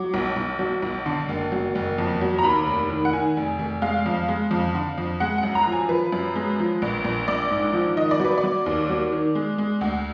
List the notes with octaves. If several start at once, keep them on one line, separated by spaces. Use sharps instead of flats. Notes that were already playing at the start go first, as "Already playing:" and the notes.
Already playing: F#3 D6
B1
B1
F#3
B1
D3
F#1
F#3
F#1
F2
F#3
A#5
D#2 B5
F1
D#3
F#5
D#3 G#5
F1
F1
G#3 F5
F2
G#3
F2
D3
F2
G#3 F#5
F#5
F#2
A#5
F3
G#5
F3 B4
F#2
G#3
F3
A#1
A#1
A#1 D5
G#2
F3
D#3 D#5
D5
F#3 B4
D5
F#3
D#2
F#3
D#3
G#3
G#3
D2